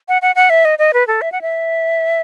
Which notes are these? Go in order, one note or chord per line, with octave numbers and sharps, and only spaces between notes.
F#5
F#5
F#5
E5
D#5
D#5
B4
A4
E5
F#5
E5